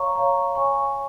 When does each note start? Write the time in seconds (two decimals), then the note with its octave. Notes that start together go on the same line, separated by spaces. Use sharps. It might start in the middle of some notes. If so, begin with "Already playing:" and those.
Already playing: C#5 F5 A#5 C#6
0.16 C#5 F5 A#5 C#6
0.55 C#5 G#5 C#6